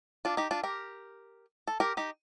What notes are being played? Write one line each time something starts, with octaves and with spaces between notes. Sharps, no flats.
D4 F4
D#4 G4
D4 F4
G4 A#4
A4
G4 A#4
D#4 G4